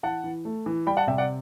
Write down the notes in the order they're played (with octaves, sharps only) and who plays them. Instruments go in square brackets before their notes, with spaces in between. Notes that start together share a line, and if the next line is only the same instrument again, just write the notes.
[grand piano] E3 F#5 A5
E3
A3
E3
G3 G5 B5
F#5 A5
C3 E5 G5
D5 F#5